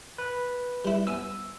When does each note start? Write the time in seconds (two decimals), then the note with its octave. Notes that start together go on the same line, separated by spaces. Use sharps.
0.18 B4
0.85 G3 E4
1.07 B3 G#5 E6